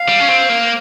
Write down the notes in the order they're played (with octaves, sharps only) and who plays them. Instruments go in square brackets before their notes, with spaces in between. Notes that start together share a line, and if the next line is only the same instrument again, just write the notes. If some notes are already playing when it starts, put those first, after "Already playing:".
Already playing: [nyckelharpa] F5
[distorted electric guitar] G3
C#4
C4
A#3